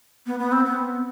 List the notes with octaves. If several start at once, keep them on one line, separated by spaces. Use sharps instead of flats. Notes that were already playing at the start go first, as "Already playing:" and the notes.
B3
B3
C4
B3